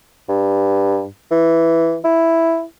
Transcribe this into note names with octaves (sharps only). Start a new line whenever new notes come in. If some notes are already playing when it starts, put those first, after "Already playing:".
G2
E3
E4